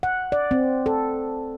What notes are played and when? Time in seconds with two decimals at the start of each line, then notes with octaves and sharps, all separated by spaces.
0.03 F#5
0.32 D5
0.51 C4
0.86 A4